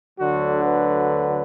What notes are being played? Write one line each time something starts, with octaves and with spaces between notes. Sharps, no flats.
D2 D3 F#3 F#4
B4